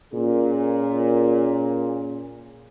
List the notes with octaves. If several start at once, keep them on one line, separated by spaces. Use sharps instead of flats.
A#2 C#4 G#4